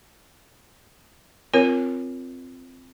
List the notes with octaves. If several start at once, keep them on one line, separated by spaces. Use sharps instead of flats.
C4 F4 A#4 C#5